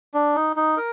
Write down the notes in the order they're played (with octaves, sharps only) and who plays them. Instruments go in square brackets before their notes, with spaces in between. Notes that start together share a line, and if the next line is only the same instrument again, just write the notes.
[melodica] D4
D#4
D#4
A#4